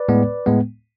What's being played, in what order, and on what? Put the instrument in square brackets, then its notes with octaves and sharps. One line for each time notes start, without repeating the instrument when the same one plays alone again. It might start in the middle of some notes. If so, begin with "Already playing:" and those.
Already playing: [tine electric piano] B4 D5
A2 G#3 B3
A2 G#3 B3